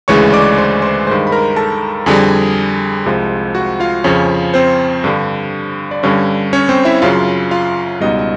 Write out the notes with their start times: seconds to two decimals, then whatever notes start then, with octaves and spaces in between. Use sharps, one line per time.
0.08 D2 C#3 E3 G#3 C#5 C#6
0.33 D5 D6
0.58 C5 C6
0.82 C5 C6
1.07 G2 D#3 G#3 C5 C6
1.27 B5
1.32 A#4 A#5
1.56 A4 A5
2.06 F2 D3 G3 G#4 G#5
3.06 C2 C3 F3 G#3
3.55 F#4 F#5
3.80 F4 F5
4.04 F2 C#3 F3 C#4 C#5
4.54 C4 C5
5.04 G2 D3 G3
5.91 D5
6.03 G2 D3 G3 C#4 C#5
6.53 C#4 C#5
6.69 C4 C5
6.85 E4 E5
7.02 F#2 C#3 F#3 F4 F5
7.51 F4 F5
8.01 C#2 B2 G3 D#4 D#5
8.19 D#5